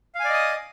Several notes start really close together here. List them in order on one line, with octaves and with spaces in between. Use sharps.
F5 G#5 D5 D#5 D#6